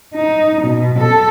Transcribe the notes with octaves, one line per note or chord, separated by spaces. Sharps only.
D#4
B2
A4